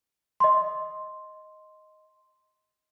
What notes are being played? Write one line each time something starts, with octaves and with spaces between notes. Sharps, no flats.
D#5 C6